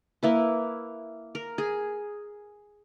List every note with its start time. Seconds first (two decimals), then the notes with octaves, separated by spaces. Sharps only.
0.23 A#3 E4 B4
1.35 A#4
1.58 G#4